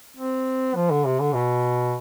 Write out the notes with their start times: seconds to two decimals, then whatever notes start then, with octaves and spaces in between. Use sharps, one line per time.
0.17 C4
0.75 F3
0.91 D3
1.06 C3
1.20 D3
1.34 B2